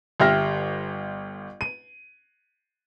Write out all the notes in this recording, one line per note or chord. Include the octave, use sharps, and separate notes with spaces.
G1 G4 E5 G5 F6 A#6
D#7